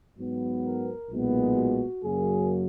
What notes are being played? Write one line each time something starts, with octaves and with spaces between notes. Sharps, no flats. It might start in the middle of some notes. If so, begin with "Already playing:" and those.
G#2 F#3 B3
A#4
B1 A#2 G#3 B3
F#4
F#2 C#3 F#3 A#3 G#4